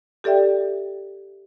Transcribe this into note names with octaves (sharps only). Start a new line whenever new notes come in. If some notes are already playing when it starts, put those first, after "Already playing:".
G4 A4 D5 E5 G5